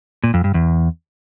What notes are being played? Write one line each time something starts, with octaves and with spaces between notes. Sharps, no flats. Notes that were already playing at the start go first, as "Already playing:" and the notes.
A#2
F2
G2
E2